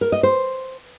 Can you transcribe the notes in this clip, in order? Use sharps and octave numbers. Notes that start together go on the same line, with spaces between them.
A#4
D#5
C5